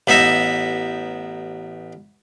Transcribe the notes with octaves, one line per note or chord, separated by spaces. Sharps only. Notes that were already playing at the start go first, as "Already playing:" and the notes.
A1 B3 D#4 E5 A#5